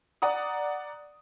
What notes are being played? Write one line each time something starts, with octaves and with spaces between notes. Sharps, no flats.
D5 F#5 A#5 D#6